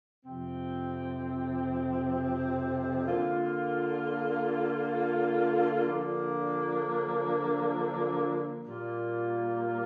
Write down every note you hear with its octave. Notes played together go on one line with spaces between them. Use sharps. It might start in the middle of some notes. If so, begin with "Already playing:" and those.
F2 C3 F3 C4
D3 A#3 F4
D3 F3 A#3 D4 F4
A#2 G3 A#3 F4